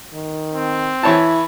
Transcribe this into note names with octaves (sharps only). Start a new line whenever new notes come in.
D#3
C4
E3 E4 C#5 A5 B5